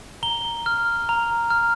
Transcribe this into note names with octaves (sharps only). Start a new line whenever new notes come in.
A#5 G7
F6
A#5
F6